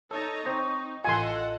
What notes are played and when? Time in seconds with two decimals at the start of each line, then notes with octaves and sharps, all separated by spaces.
0.11 D#4 A4 C#5 A5 A#5
0.45 C4 D#4 C5 D#5 C#6
1.05 A1 F4 A4 D#5 F#5 G#5 C6